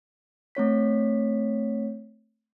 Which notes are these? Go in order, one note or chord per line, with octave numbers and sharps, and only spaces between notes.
A3 C4 C#5 B6